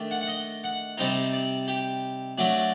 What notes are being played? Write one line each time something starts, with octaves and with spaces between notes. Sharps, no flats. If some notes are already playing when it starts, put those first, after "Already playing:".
Already playing: D#3 A3 D4
F#5
F#5
D#5
F#5
C3 G3 C4 D#4 D#5
D5
G4
F#3 A3 D4 F#4